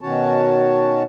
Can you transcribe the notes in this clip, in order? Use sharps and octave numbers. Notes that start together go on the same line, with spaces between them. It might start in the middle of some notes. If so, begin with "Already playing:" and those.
B2 D#3 C#4 F#4 C#5 A5